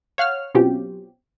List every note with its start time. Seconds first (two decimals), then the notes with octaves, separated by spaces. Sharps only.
0.18 C#5 F5 F#5 F6
0.55 B2 F#3 C4 C#4 F4 G4